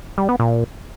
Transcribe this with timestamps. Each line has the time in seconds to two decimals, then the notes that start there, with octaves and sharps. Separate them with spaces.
0.18 G3
0.29 B3
0.40 A#2